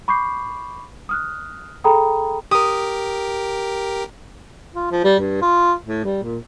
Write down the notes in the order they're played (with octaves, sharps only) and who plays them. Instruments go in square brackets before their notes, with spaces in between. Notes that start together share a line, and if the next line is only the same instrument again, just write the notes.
[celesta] B5 C#6 D6 G6 C7
D#6 F6 F#6
G#4 A4 G5 A#5 B5 D#6
[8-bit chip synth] G4 A#4 [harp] D#6
[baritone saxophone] F4
F3
G3
G2
F4
A2
G3
A#2